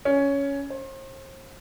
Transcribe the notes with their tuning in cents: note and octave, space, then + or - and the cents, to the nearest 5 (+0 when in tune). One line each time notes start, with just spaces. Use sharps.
C#4 +10
C5 +40